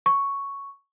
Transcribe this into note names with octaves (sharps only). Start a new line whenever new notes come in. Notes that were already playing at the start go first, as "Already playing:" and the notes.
C#6